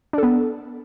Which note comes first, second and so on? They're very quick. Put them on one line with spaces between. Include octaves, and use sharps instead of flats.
D4 A4 B3